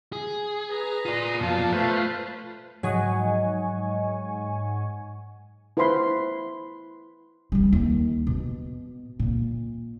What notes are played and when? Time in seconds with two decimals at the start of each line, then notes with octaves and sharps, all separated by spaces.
0.13 G#4
0.71 B4 A#5
1.05 F4 D5 C6 D#6
1.41 F#2 B2 F3 F5 A5
1.72 A3 F4 B4 C5
2.83 G#2 F#3 C#5 D#5 F#5 G#5 C#6
5.77 E4 B4 C5 B5 C6
7.52 E3 G3
7.73 D#2
8.27 B2
9.19 A#2